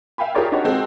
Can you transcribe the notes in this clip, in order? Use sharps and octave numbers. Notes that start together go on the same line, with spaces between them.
E5 F5 G5 G#5 B5
F4 G4 G#4 A#4 C#5 D5
D4 D#4 F#4 G4 C#5
G#3 C4 F#4 A4